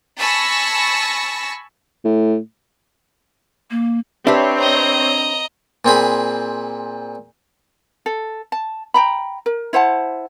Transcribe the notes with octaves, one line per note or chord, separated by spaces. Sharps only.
G#5 A5 B5 C#6 E6 A#6
A2
A#3
C4 D4 G4 B4 C#5 E5
D#5 A#5
A#2 C4 G#4 B5
A4
A5
G5 A#5 B5
A#4
E4 C5 F#5 A5